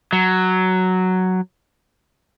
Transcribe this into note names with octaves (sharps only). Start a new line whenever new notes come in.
F#3